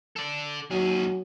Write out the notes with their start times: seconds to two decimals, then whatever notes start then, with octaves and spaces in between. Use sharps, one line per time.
0.16 A4 D5
0.71 D#2 F#3 G#4